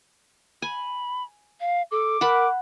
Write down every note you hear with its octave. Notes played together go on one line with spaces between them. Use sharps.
G#5 B5
F5
A4 D6
A#4 F#5 A5 B5